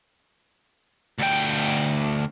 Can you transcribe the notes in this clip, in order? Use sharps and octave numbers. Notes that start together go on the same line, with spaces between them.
D2 G5